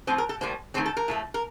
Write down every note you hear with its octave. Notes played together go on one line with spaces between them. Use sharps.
A2 F3 C4 C5
A#4
A4
A2 G3 A#3 C5
D#3 A3 C4 C5
A4
A#4
A2 F3 A3
A#4